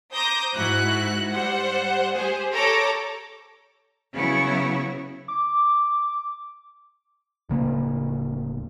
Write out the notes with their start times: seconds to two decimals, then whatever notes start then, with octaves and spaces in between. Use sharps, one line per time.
0.13 C5 A#5 D6 D#6 G6 A#6
0.54 G#2 E4 F#4 F#6
1.32 G3 C5 F#5
2.14 G4 G#4 C5
2.55 G4 A4 C#5 A#5 D6
4.13 C#3 F#3 B3 E4 C#5
5.28 D6
7.49 D1 C#3 A#3